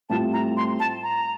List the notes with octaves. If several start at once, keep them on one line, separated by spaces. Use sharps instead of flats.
A2 G3 C4 F4 A5
A#5
C6
A5
A#5